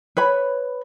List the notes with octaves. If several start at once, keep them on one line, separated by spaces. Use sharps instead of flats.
B4 C#5 B5